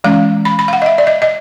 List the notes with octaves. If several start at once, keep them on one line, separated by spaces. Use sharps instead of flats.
E3 G#3 C#4 F5
B5
B5
F5
F#5
D#5
E5
D5
D#5
D#5